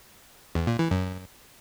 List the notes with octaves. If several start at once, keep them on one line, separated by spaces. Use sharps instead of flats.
E2
A#2
E3
F#2